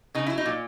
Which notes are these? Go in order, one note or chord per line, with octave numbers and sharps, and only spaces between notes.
C#3 D#4
F#3 E4
D#4
A#2